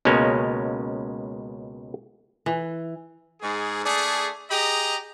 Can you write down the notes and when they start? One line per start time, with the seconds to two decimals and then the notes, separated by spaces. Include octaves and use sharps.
0.05 C#2 B2 G#3 A#3 C#4
2.46 E3
3.41 G#2 G#4
3.85 A3 D4 G#4
4.51 G4 G#4 D#5 A#5